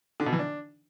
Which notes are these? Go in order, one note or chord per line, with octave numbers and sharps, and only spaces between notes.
D3
B2
E3
D4